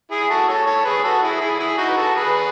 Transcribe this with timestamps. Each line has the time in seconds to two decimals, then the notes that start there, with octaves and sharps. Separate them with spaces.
0.11 E4 G#4
0.30 F#4 A4
0.48 A4 C#5
0.66 A4 C#5
0.85 G#4 B4
1.04 F#4 A4
1.23 E4 G#4
1.41 E4 G#4
1.59 E4 G#4
1.78 D#4 F#4
1.88 B4
1.97 F#4 A4
2.15 G#4 B4